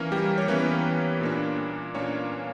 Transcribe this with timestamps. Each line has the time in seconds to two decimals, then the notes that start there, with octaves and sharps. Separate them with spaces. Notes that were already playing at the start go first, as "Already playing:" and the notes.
Already playing: E3 A#3 C#4 A#4
0.12 G3 G4
0.38 C#5
0.48 E3 A#3 B3 C#4 B4
1.21 A#2 A#3 D4
1.95 A#2 A#3 C#4 D4 C#5